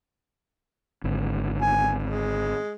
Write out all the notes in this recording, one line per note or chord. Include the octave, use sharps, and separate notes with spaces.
G#1 D3
G#5
G#3